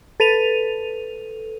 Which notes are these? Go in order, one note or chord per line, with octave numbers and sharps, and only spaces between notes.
A4 B4 D#7 F7